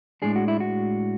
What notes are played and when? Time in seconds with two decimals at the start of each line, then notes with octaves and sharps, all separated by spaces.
0.22 A2 G#3 D4 G#4
0.36 F#4
0.48 E4
0.60 F#4